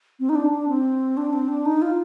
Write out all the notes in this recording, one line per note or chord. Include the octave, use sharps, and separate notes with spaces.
C4
D#4
D4
D4
C4
D4
C4
D4
D#4
F4